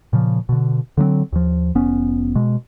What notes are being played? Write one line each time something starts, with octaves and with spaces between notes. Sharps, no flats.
A#2 C#3 F3
B2 D3
D3 F#3 A#3 C4
D#2 F3
F1 B3 C#4
B2 G#3